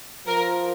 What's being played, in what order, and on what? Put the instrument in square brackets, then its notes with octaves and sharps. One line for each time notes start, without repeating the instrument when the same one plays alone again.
[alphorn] F3 [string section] A#4